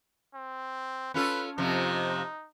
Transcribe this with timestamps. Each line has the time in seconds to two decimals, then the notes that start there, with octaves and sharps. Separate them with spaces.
0.34 C4
1.14 C#4 F4 A4 B4
1.58 F2 C3 F3 D#4